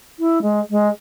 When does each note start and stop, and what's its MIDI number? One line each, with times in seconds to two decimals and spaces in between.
0.19 0.39 64
0.42 0.60 56
0.70 0.88 56